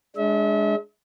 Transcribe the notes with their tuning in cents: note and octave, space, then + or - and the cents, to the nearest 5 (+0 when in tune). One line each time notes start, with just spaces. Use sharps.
G#3 +0 D4 +0 E5 -40